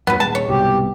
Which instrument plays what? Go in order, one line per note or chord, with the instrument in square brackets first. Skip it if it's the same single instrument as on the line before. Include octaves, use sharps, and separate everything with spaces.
[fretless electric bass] F2 G#2 F#3 [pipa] B3 B4
[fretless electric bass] D#1 G#3 [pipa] A5
[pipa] C#5
[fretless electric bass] C2 G#2 B2 [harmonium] G4